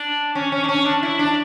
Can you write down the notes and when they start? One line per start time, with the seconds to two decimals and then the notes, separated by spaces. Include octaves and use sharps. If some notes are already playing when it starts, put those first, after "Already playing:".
Already playing: D4
0.35 C#4
0.52 C#4
0.64 D4
0.69 C#4
0.85 D4
1.03 E4
1.19 D4